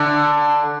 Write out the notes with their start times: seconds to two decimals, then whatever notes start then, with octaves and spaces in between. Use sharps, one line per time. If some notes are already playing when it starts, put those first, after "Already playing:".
Already playing: D3